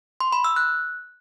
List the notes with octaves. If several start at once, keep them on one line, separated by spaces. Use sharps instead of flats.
C6
B5
E6
F#6